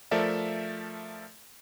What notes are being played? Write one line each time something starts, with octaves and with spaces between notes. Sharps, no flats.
F3 A3 A4 A#4 D5 E5